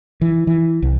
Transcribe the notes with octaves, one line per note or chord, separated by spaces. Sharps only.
E3
E3
C2